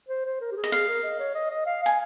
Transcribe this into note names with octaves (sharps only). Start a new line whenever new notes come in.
C5
C5
A#4
G4
G#4
D#5
G#4 F5
A#4
D#5
C#5
D#5
D#5
F5
F5 G#5